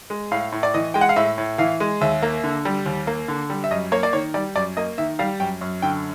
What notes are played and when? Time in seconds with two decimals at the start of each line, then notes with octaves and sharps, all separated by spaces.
0.10 G#3
0.32 A2 F5
0.52 A2
0.63 D5
0.74 E3 D#5
0.94 G#3 G5
1.01 F#5
1.09 F5
1.16 A2 E5
1.38 A2
1.58 E3 F5
1.80 G#3
2.01 D#2 E5
2.22 A#3
2.44 D3
2.65 G3
2.86 D#2
3.07 A#3
3.28 D3
3.50 G3
3.64 E5
3.71 F#2 D#5
3.92 A#3 C#5
4.03 D5
4.13 D#3 C#5
4.34 G3 D5
4.56 F#2 D5
4.77 A#3 D#5
4.98 D#3 E5
5.19 G3 F5
5.40 F#2 G5
5.61 F#2
5.82 D3 G5